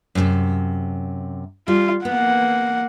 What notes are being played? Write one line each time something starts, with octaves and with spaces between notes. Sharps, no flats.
F#2 A2 C3
G3 F4
A#3 B3 F#5